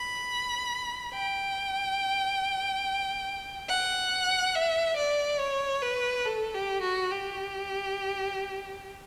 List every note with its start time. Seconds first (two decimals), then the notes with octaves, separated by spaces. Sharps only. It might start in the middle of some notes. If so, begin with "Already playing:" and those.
Already playing: B5
1.14 G5
3.70 F#5
4.55 E5
4.97 D5
5.40 C#5
5.82 B4
6.25 A4
6.54 G4
6.82 F#4
7.11 G4